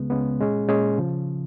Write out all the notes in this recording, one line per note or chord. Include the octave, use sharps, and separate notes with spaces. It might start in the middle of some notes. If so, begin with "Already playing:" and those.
Already playing: C#2 C#3 G#3 B3
C#2 C#3 G#3 B3
A#2 G#3 C#4 G#4
A#2 G#3 C#4 G#4
C#3 F3